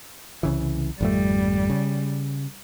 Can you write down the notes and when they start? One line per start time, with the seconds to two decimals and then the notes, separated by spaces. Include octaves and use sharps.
0.43 C2 C#3 E3
1.01 G#1 F2 G3 A3
1.70 C#3